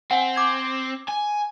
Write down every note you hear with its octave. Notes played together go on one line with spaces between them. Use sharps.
C4 F#5 G#5
D6 G#6
G#5